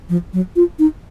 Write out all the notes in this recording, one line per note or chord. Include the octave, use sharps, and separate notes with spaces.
F3
F#3
F4
D#4